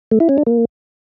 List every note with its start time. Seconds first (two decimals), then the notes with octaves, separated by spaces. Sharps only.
0.11 A3
0.20 E4
0.29 C#4
0.38 D4
0.46 A#3